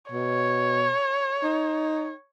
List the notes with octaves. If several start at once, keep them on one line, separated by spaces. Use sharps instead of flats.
B2 C#5
D#4